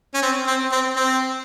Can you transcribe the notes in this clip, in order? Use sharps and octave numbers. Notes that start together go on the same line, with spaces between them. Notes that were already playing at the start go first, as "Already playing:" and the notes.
C#4
C4
C4
C4
C4